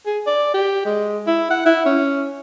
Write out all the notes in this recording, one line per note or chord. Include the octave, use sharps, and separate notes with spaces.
G#4
D5
G4
G#3
E4
F#5
E4
C#4